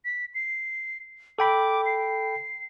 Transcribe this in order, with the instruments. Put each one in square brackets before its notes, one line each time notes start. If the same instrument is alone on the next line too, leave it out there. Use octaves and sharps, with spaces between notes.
[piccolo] B6
C7
[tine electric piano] A4 G5 B5 [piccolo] D6
[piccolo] C7